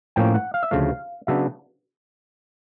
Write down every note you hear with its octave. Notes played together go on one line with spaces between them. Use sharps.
A2 F3 A#3 C#4 G5
F#5
F5
E5
D2 C#3 F3 A3 F5
C#3 F#3 B3 D4 E5